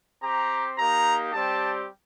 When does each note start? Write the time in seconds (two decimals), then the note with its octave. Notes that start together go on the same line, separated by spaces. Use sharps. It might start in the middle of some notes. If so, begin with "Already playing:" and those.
0.23 C4 G4 A#5
0.79 A#3 D#4 G4 A#5
1.34 G3 C4 G4 A5